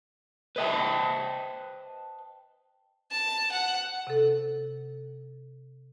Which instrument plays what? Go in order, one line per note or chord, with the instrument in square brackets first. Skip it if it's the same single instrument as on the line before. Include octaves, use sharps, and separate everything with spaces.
[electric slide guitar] B4 C5 D#5 F5 G5 A5
[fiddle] A5
F#5
[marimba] C3 A4